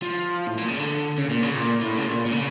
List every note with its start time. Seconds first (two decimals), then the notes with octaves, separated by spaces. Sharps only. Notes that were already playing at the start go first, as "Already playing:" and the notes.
0.02 F3
0.47 A2
0.57 A#2
0.68 C#3
0.79 D3
1.18 C#3
1.30 A#2
1.43 C#3
1.55 A#2
1.80 A2
1.97 C#3
2.06 A#2
2.26 A#2
2.32 C#3